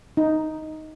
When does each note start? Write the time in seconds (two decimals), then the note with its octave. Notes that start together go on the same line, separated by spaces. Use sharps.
0.17 D#4